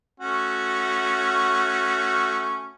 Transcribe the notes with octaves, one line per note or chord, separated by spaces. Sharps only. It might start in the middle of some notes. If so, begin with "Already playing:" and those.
A3 C#4 F#4